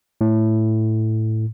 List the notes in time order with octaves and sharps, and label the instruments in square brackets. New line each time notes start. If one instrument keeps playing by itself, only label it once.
[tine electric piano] A2